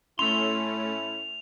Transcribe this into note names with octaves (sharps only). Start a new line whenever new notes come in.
A2 A3 C#4 E4 C6 E6 F7